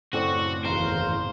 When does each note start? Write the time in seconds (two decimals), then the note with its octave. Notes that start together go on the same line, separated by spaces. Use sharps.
0.13 F#2 A2 C#3 C4 F#4 A4 D5
0.65 G#1 E2 C5 F5 A#5 C6